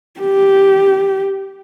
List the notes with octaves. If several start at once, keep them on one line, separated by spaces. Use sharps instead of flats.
G4